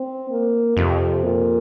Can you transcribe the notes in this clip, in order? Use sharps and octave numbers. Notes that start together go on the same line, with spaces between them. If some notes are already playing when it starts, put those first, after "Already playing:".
Already playing: C4
A#3
F2 C3
A#2